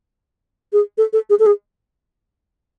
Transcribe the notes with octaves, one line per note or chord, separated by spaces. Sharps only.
G#4
A4
A4
G#4
A4
G#4